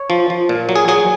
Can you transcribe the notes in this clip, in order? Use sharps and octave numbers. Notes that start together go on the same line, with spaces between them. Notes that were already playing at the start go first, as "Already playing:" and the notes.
Already playing: C#5
F3
F3
A#2
F#3
G#4
F#3 G#4